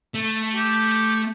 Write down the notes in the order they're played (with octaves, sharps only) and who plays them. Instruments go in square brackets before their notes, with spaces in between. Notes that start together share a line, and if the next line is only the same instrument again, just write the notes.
[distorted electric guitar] A3
[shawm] G4